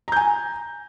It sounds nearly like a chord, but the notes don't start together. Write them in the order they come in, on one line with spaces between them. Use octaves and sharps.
A#5 G6 G#5